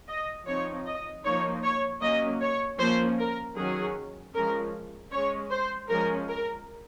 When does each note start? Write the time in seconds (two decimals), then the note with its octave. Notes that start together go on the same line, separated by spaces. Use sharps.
0.08 D#5
0.47 F3 C4 D#4 C#5
0.86 D#5
1.24 F3 A#3 D#4 C#5
1.63 C#5
2.02 F#3 A#3 C#4 D#5
2.41 C#5
2.79 F3 A#3 C#4 C5
3.19 A#4
3.57 D#3 F#3 C#4 G#4
4.35 F3 G#3 C#4 A#4
5.11 G#3 C#4 C#5
5.51 C5
5.89 F3 G#3 C#4 A#4
6.28 A#4